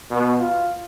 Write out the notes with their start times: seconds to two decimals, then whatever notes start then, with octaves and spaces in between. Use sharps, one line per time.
0.10 B2
0.40 F4